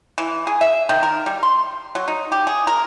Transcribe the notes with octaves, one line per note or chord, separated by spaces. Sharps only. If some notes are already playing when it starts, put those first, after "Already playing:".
E3
G#4
E5
D#3
A#4
G3
C6
F#3
D#4
G4
G#4
A#4